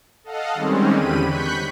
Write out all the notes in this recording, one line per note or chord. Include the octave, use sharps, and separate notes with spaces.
A4 D#5 F5 F#5
D#3 G3 G#3 C4 C#4
E2 D3 G4 B5 D#7
B5 C#6 F#6 G6 B6